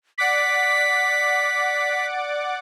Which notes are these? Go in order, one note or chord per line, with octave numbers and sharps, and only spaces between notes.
D5 F#5 D6 B6